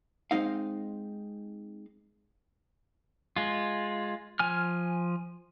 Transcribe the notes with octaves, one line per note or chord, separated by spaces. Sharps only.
G#3 C4 D#4 F5
G#3 F4
F3 G#5 F6